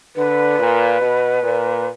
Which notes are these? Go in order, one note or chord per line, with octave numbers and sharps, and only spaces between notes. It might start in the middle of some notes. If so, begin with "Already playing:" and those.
D3 B4
A#2
B2
A#2